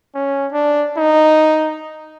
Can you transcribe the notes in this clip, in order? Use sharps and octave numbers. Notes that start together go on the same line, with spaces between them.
C#4
D4
D#4